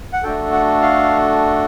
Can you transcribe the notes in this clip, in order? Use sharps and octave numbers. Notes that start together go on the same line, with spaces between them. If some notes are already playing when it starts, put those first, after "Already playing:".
F#5
A3 D4 F#4 A4 G5
F#5
F5